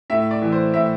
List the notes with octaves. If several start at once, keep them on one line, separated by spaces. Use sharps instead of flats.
A2 E5
D5
E3
C5
A2 E5